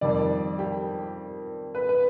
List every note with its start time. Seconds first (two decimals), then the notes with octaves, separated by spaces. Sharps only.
0.01 F2 D#3 G3 D5
0.59 G4
1.75 B4
1.89 B4